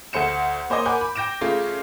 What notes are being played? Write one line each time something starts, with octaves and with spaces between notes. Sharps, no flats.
D2 A3 C5 C#7 E7
A#3 C5 C#5 D#5
A#4 F#5 G#5 B5 D6 G6
B5
G5 G6 A#6 D7 E7
C#3 A3 C#4 F4